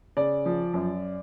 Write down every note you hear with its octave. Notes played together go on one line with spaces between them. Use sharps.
C#3 D5
F3
F#2